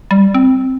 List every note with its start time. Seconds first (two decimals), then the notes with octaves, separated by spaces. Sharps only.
0.11 G3
0.34 C4